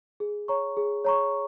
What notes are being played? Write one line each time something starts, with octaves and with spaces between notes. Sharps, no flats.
G#4
C#5 A#5 C#6
G#4
C#5 A#5 C#6